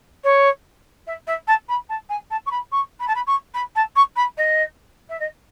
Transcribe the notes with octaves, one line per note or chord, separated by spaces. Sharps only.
C#5
E5
E5
A5
B5
A5
G#5
A5
C#6
B5
C#6
B5
A5
B5
C#6
B5
A5
C#6
B5
D#5
E5
D#5